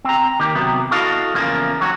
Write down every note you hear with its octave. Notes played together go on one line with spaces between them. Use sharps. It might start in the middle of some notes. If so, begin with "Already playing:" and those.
C4 A#5
D#3 A#3 G4
C3 F#3 B3
E4 F#4 A4 D#5 F5
E2 C#3 F3 A#3
D#2 F#3 F#4